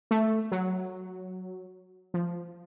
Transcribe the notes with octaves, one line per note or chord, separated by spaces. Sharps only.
A3
F#3
F3